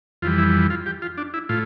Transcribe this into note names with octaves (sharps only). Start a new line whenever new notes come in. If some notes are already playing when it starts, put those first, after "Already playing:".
F2 E3 G3 F4
E4
F4
G4
F4
D4
E4
A2 F4